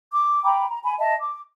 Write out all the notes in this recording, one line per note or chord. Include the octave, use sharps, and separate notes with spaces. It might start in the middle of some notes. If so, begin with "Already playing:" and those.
D6
G5 A#5 B5 D6
A#5
G#5 B5
D#5 E5 A5
D6